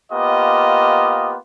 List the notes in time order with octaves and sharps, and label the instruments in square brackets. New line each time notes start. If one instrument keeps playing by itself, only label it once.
[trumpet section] A#3 B3 F4 G4 D#5